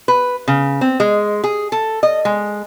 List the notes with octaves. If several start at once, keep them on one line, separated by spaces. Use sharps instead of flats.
B4
C#3
C4
G#3
G#4
A4
D#5
G#3